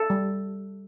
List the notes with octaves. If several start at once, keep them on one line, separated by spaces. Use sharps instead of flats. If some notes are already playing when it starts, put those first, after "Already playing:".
Already playing: A4
G3